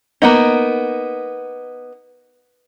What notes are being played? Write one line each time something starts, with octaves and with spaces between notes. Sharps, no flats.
A#3 B3 D#4